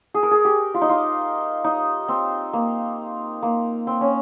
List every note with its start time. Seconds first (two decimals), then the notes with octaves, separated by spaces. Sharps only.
0.14 G#4
0.23 A#4
0.31 G#4
0.45 G4
0.74 F4
0.81 D#4
0.89 F4
1.64 D#4
2.08 C4
2.53 A#3
3.43 A#3
3.87 C4
4.01 C#4